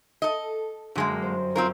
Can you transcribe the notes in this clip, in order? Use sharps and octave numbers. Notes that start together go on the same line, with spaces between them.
A4 D#5
G1 F#2 D3 G#3 A#3
C5
C4 C#4 F4 A#4